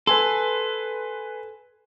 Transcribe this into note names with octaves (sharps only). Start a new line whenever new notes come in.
A4 B4 G#5 C6